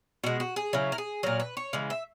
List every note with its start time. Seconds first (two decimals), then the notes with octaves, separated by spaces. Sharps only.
0.24 B2 G#3 F#4
0.40 F#4
0.56 G#4
0.73 C#3 F#3 E4
0.92 A#4
0.98 G#4
1.23 A#2 F#3 A#4
1.40 B4
1.57 C#5
1.73 C#3 E3 G#3
1.90 E5